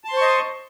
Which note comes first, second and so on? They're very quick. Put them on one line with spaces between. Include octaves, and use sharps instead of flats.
A5 C6 C5 C#6 D#5